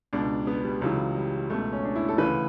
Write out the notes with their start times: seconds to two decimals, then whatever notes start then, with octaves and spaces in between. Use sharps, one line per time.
0.13 C#2 B2 D4
0.47 B3
0.64 G3
0.81 C#2 C#3 E3 F#3
1.15 G3
1.50 C#2 B2 A3
1.73 C#4
1.84 D4
1.96 E4
2.08 A4
2.18 D2 C#3 E3 B4